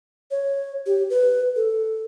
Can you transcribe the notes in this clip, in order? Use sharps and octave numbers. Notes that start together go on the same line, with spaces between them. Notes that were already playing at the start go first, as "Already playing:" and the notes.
C#5
G4
B4
A4